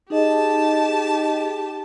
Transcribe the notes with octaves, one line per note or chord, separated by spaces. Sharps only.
D#4 G4 G#4 D#5 A5